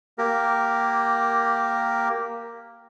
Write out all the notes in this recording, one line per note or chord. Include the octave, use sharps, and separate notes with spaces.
A#3 G4 A#4